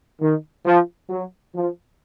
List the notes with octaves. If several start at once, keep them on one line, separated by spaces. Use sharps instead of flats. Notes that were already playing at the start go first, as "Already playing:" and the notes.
D#3
F3
F#3
F3